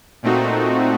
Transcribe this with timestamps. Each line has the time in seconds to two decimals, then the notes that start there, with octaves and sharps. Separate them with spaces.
0.23 A#2 A3 C4 D#4 F#4